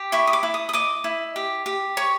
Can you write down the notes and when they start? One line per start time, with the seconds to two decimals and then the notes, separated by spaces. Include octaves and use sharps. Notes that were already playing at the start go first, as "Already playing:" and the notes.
Already playing: G4
0.12 E4 C#6
0.27 D#6
0.33 D6
0.43 E4
0.54 D#6
0.69 D#6
0.73 D#5 D6
1.04 E4
1.36 G4
1.66 G4
1.97 C#5 C#6